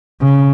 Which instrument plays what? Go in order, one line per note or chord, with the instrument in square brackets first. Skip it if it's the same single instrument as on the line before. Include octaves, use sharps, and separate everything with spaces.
[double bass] C#3